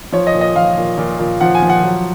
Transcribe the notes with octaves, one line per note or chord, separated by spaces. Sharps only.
F3 C#5
D#5
A#2
D#5
F3 F5
A#2
A#2
A#2
F3 F#5
G#5
F3
F#5
F#3